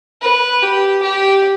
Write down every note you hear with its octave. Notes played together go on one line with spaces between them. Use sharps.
B4
G4
G4